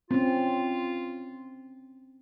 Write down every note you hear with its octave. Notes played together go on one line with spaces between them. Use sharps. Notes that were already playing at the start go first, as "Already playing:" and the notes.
C4 C#4 F4